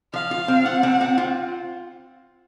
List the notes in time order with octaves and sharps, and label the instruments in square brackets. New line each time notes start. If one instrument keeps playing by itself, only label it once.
[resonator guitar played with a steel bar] F3 [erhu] F5
[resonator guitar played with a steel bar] F4
C4
[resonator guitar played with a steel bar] F4 [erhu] F#5
[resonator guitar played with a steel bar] C4
C4
F4